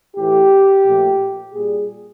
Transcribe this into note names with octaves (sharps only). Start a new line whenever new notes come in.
A2 E3 A3 G4
A#2 F3 A3
A#2 G3 G#4